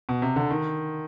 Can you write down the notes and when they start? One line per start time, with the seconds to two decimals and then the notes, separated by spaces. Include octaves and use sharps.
0.09 B2
0.22 C3
0.36 D3
0.50 D#3